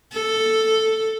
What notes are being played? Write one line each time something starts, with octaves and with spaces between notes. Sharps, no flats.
A4